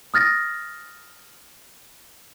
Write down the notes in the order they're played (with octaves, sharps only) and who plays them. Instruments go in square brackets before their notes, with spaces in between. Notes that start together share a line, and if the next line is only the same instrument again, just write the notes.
[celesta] D#6 F6 A6 A#6